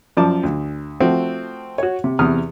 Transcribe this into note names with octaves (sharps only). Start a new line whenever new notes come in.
F#2 F3 D5 A5 D6
D2
F3 A3 C4 F#4
F#4 C#5
C3
E2 C3 D#6 F6